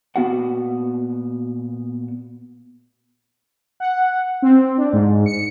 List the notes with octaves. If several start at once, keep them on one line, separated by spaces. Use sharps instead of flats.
A#2 B3 F#4 F#5
F#5
C4
D4
G#2
C#7